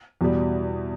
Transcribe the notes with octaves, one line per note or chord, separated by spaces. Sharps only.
E2 B2 G3